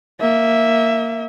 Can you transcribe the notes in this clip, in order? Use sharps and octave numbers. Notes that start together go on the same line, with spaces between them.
A#3 E5